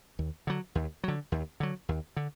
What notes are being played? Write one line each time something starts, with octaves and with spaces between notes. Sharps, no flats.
D#2
D3 F#3
D#2
D3 F#3
D#2
D3 F#3
D#2
D3